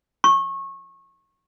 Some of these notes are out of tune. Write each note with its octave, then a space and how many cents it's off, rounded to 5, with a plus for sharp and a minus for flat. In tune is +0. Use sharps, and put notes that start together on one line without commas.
C#6 -25